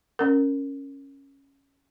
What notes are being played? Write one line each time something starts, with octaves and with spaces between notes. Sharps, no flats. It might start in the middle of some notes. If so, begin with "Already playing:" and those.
C#4 A#4